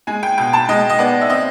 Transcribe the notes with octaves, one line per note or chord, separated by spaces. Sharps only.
G#3 G#5
G5
B2 G5
A5
G#3 D#5
D#5
B3 D5
E5
C4 D#5